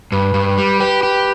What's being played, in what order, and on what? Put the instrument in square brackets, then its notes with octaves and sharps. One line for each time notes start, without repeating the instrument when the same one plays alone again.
[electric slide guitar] G2 [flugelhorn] B4
[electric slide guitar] G2
[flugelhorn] B4
[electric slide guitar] G3
[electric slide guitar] G4 [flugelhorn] B4
[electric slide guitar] G4